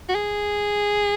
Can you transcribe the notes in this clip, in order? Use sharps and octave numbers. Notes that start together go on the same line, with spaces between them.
F#4
G#4